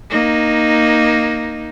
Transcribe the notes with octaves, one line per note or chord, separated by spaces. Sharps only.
A#3 D#4